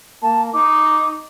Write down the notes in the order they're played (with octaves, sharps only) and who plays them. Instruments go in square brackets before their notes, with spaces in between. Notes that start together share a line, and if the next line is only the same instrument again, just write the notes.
[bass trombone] A#3 [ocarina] A5
[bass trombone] D#4 [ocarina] D6